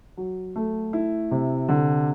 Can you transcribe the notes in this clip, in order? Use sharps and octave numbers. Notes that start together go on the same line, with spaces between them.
F#3
A3
E4
C3
D3